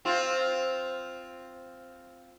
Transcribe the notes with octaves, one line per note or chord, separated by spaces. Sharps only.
C4 F4